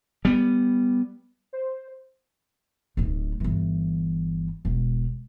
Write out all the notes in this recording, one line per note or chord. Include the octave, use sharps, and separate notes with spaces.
G3 B3
C5
D1 D#4
G1 E3
E1